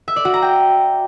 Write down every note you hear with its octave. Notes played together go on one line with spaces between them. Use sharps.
E5
D5
F#4
A#5
G5